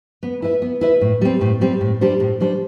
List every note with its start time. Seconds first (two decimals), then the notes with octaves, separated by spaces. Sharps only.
0.23 B3
0.42 E4 B4 E5
0.62 B3
0.81 E4 B4 E5
1.01 A2
1.21 G3 C4
1.41 A2
1.61 G3 C4
1.81 A2
2.01 G3 D4 G4 C5
2.20 A2
2.40 G3 D4 G4 C5